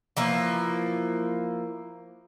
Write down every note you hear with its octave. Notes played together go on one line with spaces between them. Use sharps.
E3 F3 A#3